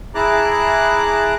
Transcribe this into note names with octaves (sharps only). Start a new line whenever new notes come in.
E4 G#4 A5 A#5 D6 F#6